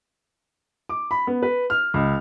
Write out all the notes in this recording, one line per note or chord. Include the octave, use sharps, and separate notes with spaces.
D6
B5
B3
B4
F6
C#2